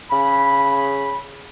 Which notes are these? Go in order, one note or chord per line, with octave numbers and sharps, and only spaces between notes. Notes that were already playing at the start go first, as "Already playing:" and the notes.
C#3 B5